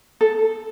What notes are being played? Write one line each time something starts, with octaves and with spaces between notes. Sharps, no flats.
A4